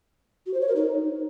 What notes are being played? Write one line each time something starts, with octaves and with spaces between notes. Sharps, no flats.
F#4
C5
C#5
A#4
D#4